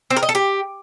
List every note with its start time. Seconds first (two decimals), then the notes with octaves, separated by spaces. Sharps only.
0.10 C4
0.17 A#4
0.23 D#5
0.29 A4
0.35 G4